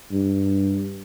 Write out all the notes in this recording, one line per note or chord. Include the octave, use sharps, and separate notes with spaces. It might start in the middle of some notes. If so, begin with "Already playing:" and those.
G2